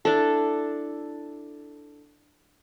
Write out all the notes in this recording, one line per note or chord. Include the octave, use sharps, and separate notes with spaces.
D4 E4 A4